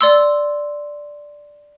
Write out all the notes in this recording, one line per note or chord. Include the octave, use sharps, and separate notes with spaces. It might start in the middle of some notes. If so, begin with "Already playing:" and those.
D5 C6 E6